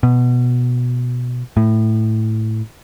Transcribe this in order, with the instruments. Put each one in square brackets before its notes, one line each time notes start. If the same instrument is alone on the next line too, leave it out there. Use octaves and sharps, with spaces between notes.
[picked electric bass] B2
A2